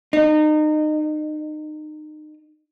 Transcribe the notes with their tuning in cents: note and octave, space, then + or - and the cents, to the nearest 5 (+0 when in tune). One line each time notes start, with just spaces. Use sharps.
D#4 -30